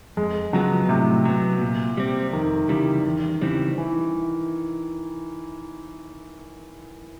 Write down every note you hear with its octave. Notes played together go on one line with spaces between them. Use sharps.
F2 G#3
C#3 F3 F#3 G#3 B3
A2 C3
F#3 B3
A#2
G3 C4
F2 D#3
C#3 E3 G3
E2
C#3 E3 G3 C4
E3